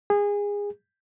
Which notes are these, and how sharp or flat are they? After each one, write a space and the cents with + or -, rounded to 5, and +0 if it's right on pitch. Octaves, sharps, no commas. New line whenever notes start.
G#4 -25